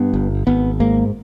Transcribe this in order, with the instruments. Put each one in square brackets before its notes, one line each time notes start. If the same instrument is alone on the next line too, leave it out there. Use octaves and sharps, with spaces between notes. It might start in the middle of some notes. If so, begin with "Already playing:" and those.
Already playing: [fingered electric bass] G2 B3
G1
G#1 B3
G#2 A#3